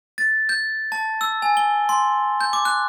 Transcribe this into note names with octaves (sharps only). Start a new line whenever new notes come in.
A6
G6
A5
E6
G#5
G7
C6
G6
D6
F#6